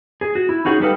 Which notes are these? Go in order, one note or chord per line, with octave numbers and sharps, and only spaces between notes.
G#4
F#4
E4
C#4 D#4 F#4 G#4
G3 D#4 G4 A4 B4 F5